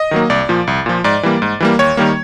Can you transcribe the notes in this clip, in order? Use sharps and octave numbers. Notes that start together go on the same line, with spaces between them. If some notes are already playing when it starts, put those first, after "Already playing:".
Already playing: D#5
D#3 F#3 A#3
C2 D5
A#2 F3
C2
A#2 F3
G#2 D5
E3 G3 A#3
G#2
E3 G3 A#3
D#2 C#5
D#3 G3 A#3